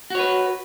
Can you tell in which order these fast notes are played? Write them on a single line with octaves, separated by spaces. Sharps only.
F#4 C#5 B4